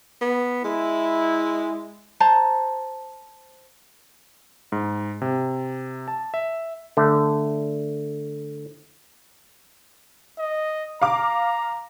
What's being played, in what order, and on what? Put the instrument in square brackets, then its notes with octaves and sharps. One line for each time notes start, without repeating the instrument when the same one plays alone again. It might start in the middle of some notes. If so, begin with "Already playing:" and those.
[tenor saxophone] B3
[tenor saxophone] G#3 [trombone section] E4
[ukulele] C5 A5 A#5
[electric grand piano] G#2
C3
A5
E5
[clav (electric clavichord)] D3 A3
[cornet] D#5
[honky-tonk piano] F5 D6 [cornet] A#5